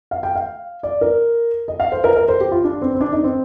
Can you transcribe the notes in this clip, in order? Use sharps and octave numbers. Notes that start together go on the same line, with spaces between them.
F5
G5
F5
D5
A#4
D#5
F5
C5
A#4
A#4
C5
G4
F4
D4
C4
C4
D4
D#4
C4